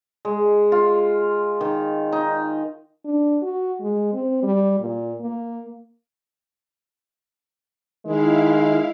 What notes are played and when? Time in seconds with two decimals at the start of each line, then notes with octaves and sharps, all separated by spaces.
0.25 G#3
0.72 F4
1.61 D#3
2.12 D#4
3.05 D4
3.42 F#4
3.81 G#3
4.14 C4
4.43 G3
4.80 A#2
5.20 A#3
8.06 D#3 G#3 E4 F5